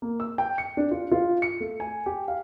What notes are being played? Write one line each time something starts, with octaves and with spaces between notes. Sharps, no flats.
A#3
E6
G5
C#7
D4
F4
F4
C#7
A3
G#5
G4
F5